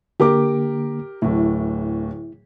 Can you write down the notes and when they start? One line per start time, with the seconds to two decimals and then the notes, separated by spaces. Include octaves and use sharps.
0.20 D3 A#3 G4 A#4 D6
1.22 D1 A2 E4